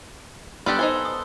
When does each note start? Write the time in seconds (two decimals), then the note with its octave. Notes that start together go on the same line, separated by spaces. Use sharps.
0.66 G3 B3 D4 G4 A4 C6 E6 F#6
0.79 D#4 C5 G#5 G7
1.05 D#6